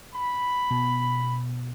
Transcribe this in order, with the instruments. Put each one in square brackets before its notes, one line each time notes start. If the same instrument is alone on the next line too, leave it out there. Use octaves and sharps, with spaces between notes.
[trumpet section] B5
[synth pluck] B2